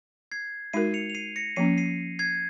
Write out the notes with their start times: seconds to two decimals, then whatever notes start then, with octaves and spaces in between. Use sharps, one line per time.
0.31 G#6 C7
0.73 G#3 D#4 F#4 A#4 C7 D#7
0.94 C#7 F7
1.10 F7
1.15 C7 D#7
1.36 A#6 C#7
1.56 F3 A#3 C#4 C7 D#7
1.78 C7 D#7
2.19 G#6 C7